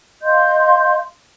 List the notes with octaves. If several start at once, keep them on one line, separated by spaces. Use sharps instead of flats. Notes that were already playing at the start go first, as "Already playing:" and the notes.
D#5 F5 C6 G6